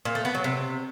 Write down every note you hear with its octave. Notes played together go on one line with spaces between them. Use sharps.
A#2
A3
B3
F#3
C3